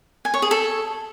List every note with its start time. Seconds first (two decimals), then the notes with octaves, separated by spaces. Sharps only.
0.25 G#5
0.34 C#5
0.42 G#4
0.51 A4